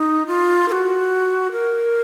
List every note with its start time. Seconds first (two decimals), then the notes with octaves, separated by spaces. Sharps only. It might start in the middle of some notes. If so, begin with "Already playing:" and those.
Already playing: D#4
0.27 F4
0.68 A#4
0.72 F#4
1.52 A#4